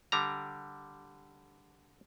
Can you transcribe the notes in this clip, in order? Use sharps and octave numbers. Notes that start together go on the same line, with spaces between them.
D3 G3 A#5